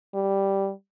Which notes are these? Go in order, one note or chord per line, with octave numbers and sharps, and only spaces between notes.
G3